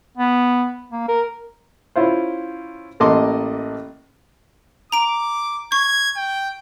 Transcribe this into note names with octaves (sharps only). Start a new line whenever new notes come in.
B3
A#3
A#4
C#4 E4 F4 C5
A1 A#3 A4 D#5 C6 D6
A#5 D6 D7
C#6 G#6
G5